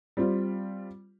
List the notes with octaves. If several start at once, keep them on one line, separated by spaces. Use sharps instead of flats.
G3 C4 F4